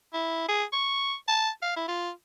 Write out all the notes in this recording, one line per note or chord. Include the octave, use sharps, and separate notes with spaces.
E4
G#4
C#6
A5
F5
E4
F4